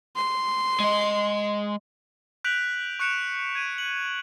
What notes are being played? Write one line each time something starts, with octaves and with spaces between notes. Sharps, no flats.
C6
G#3 D#5
F#6 G6 B6 D7 F7 F#7
C#6 F#6 C#7 D7 E7 F7
G#6 D#7
F#7